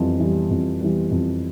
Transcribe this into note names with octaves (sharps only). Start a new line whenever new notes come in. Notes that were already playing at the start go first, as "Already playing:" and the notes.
Already playing: F2 E3 G3
E3 G3
F2
E3 G3
F2